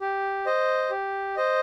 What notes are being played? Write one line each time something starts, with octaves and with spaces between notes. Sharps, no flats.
G4
C5 D#5
G4
C5 D#5